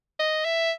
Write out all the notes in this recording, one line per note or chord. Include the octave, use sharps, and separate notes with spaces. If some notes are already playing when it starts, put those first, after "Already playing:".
D#5
E5